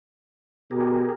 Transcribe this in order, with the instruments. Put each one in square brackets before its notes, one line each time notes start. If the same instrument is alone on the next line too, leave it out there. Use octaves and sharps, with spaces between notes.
[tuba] B2 [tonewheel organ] G4 G#4 A#4